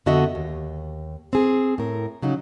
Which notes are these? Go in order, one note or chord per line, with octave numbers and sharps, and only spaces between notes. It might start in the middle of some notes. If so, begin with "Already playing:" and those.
F2 D3 B3 F#4 D#5 E5
D#2
C4 G#4
A2 A#4
C#3 F#3 D#4